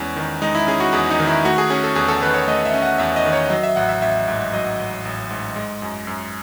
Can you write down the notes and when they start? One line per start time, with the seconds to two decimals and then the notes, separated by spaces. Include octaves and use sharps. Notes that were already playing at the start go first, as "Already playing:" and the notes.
Already playing: E2 G#3 C#4 E4
0.16 D#3
0.42 G#3 D#4
0.55 E4
0.67 C#4 G#4
0.80 F#4
0.93 E2 G#4
1.10 D#4
1.20 D#3
1.27 E4
1.45 A3 F#4
1.58 G#4
1.70 C#4 G#4
1.84 A4
1.96 E2 G#4
2.08 A4
2.22 D#3 B4
2.34 C#5
2.47 A3 D#5
2.65 E5
2.74 C#4
2.82 F#5
2.98 E2 E5
3.16 D#5
3.25 D#3
3.33 C#5
3.50 F#3 D#5
3.63 E5
3.76 A1 F#5
3.89 E5
4.02 A1 E5
4.28 G#2
4.53 F#3 D#5
4.80 A1
5.05 A1
5.30 G#2
5.56 G#3
5.82 F#2
6.07 F#2